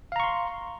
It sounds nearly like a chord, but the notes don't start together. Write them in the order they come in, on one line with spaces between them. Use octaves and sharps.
F5 A#5 C#6 C6